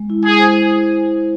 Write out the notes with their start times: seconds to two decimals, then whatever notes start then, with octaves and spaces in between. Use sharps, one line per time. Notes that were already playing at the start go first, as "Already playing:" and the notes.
Already playing: G#3
0.10 E4
0.25 G#3 G#4
0.39 C5
0.54 E4